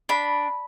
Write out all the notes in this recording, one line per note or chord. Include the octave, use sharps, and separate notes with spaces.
D4 B5